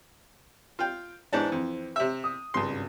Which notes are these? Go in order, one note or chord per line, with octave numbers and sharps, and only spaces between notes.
F4 G5
E2 G#2 E3 C4 D4
F2
C3 E5
D#6
G#1 C#2 G2 C#3 C6